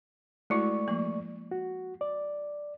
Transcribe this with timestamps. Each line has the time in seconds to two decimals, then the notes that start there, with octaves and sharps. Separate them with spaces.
0.50 G#3 A3 E4 F#4 D5 C#6
0.88 F3 A#3
1.51 F#4
2.01 D5